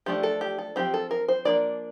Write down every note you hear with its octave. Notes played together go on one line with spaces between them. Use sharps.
F3 A3 D4 G4
A4
G4
A4
F3 C4 G4
A4
A#4
C5
F3 A#3 D4 D5